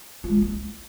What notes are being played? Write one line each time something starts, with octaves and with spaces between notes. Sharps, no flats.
F4
G#3
A#3
E4